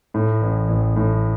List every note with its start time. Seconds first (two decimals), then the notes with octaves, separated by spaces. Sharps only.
0.14 A2
0.42 A1
0.69 A1
0.96 A2